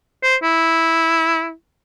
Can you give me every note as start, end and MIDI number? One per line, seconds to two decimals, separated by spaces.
0.23 0.36 72
0.43 1.52 64